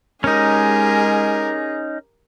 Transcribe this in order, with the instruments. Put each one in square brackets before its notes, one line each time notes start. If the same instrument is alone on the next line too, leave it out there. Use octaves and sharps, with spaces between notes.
[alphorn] G#3 [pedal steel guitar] C#4 D#4 [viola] G4 A#4 [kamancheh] G#4